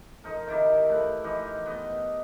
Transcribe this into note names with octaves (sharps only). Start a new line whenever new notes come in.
F3 D#4 A#4
C3 D#3 E4 G4
A3 B4
E3 F3 D#4 G4
B3 D#5